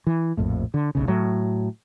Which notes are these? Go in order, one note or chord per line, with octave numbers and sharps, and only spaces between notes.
E3
A#1 F2 A2
D3
F1 B1 C#3
A2 F#3